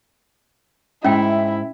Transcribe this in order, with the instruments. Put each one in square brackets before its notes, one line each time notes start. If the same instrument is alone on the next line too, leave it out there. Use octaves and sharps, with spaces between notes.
[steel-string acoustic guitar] G#2 [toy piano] C#4 G5 [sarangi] E4 [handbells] E5